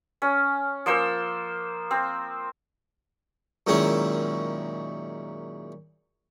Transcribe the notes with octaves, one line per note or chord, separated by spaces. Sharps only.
C#4
F3 A#3 C5 E6
C4
F#2 A#2 D#3 G#3 C#4 E4